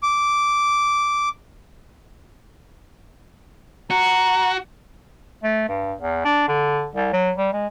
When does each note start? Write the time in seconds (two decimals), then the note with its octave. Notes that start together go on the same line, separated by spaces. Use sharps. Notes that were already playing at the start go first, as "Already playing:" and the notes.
0.03 D6
3.90 F#4 A#5
5.44 A3
5.69 G2
6.01 E2
6.25 D4
6.48 D3
6.95 C2
7.13 F#3
7.37 G3
7.53 G#3